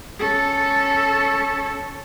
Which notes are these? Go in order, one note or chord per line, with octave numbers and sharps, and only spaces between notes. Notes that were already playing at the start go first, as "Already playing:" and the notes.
C#4 A4